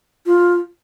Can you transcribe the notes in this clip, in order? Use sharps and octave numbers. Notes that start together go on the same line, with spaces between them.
F4